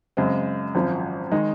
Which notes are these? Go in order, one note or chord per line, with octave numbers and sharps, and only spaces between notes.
F#2 C#3 G#3 C4
G#1 F#2 F3
D#3 G#3 D#4